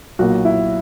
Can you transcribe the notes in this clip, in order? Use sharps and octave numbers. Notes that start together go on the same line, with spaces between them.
B1 A#2 F#3 A#3 F#4
E4